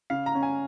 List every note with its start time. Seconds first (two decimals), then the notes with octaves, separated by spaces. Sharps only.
0.10 C#3 F5
0.26 A#5
0.35 C#4
0.43 G#5